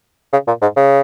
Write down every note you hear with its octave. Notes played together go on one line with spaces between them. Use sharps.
C#3
A#2
G#2
C#3